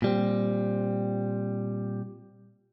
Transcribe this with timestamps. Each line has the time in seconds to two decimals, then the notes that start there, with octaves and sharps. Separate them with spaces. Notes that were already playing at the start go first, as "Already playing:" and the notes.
0.02 A#2 G3 C4